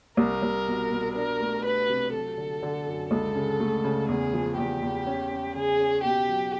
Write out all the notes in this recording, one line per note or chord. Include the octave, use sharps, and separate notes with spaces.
C2 A#4
C2
B2
B2
D4 A#4
A3
D4 B4
C3
F#3 A4
D3
D3
F#2
C#2 A4
C#3
A3
C#3
E2 G#4
F3
E2 G4
E2
C#4
C#4
C#3 G#4
C#4
B2 G4
F#3